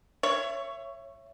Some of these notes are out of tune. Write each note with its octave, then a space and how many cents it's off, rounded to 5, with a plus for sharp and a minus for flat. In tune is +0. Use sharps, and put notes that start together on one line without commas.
C#5 +0 E5 +25